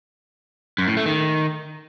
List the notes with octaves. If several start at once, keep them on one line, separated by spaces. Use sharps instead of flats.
F#2
A2
A3
D#3